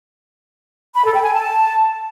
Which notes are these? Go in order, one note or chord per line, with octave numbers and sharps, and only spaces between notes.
B5
A4
G5
G#5
A5